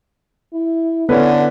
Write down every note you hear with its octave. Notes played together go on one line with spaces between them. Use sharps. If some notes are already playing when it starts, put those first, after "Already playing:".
E4
D3 B3 C#4 E4 A4 B4